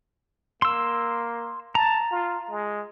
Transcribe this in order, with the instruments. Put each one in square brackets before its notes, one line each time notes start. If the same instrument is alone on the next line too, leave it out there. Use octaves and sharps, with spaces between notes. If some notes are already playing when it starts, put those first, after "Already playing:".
[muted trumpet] A#3 [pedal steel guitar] C6 E6
[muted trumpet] A5 [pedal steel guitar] A#5
[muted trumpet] F4
G#3